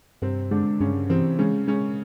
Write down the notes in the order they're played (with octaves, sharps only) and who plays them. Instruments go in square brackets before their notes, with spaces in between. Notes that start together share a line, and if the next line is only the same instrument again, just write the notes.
[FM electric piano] G2 [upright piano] C3 C4
[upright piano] D3 D4 [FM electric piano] G#3
[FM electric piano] G2 [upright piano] C#3 C#4
[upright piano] C3 C4 [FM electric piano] E3
[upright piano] C#3 C#4 [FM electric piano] G#3
[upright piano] C#3 C#4 [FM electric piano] G#3